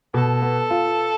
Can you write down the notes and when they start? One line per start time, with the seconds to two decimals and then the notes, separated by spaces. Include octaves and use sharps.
0.14 B2 A4
0.42 B3
0.70 F4